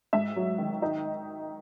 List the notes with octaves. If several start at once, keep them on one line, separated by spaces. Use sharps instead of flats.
G#2 E5
F#3
D#3
D#4